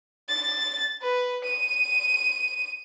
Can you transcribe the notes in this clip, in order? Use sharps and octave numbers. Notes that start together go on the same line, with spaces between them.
A6
B4
D#7